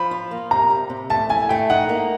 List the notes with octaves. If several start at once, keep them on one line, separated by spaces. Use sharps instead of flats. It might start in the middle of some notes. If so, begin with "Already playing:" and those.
Already playing: F3 B5
F4
A#3
C3 A#5
G3
C3
A3 A5
E4 G#5
A3 G5
D#4 F#5
A#3